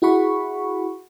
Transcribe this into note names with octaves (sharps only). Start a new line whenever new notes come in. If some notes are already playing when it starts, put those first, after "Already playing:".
E4 F#4 G#4 F#5 B5 C#6